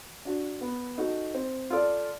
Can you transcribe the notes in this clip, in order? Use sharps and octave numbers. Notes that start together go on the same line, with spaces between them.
D4 F#4
B3
D#4 F#4 A4
C4
F4 A4 D5